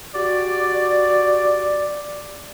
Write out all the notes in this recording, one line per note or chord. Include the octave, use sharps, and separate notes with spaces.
F#4 G4 D5